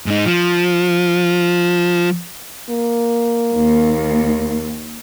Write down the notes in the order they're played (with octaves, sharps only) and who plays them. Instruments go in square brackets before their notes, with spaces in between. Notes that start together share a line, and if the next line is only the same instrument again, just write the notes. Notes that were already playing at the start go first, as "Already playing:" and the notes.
[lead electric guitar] G#2 D#4
F3
[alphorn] A#3
[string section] D#2